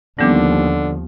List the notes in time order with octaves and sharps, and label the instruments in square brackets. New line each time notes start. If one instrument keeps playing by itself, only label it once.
[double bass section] D#2 F3 [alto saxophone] D3 [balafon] G3 B3 C#4